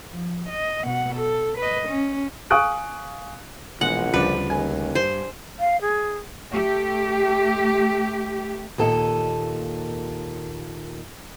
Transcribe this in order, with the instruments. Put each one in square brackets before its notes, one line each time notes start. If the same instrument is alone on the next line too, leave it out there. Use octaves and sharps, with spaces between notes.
[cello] F3
D#5
B2 F#5
A4
B4 D#5
C#4
[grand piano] F5 G#5 C#6 D#6 F#6 D7
[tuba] A#1 [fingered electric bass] B2 E3 [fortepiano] G#3 [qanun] F#5
[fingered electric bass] D2 C#3 G3 [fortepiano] F3 D4 [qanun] B4
[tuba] D#2 [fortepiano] G#5
[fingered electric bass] G2 [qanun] C5 C6
[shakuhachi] F5
G#4
[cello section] A3 G4
[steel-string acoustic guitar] D#2 A#2 A4 D#5